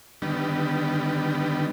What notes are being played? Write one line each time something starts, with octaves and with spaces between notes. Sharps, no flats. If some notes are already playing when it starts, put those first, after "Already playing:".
D3 D#3 G3 B3